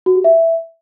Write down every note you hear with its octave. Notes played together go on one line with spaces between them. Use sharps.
F#4
G4
E5